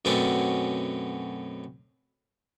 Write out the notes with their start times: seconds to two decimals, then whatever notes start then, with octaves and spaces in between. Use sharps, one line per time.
0.05 F#2 B2 A3 C4 C#4 D5